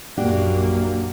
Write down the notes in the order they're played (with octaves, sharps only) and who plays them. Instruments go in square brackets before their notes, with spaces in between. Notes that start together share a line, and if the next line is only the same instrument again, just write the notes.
[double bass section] A#1 F#2 A#3 [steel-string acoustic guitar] D4 F#4 G4